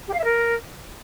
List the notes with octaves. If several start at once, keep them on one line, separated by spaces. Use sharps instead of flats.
G4
F5
E5
A#4